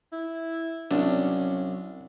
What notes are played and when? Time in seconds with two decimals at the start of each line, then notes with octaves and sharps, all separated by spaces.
0.12 E4
0.91 C2 F#3 C#4 D4